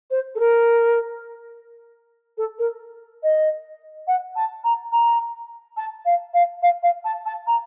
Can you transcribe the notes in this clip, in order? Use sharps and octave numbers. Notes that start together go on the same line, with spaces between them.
C5
A4
A#4
A4
A#4
D#5
F#5
A5
A#5
A#5
A5
F5
F5
F5
F5
A5
A5
A#5